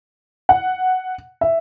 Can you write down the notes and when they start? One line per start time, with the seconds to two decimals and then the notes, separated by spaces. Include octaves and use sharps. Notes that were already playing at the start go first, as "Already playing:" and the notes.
0.49 F#5
1.41 E5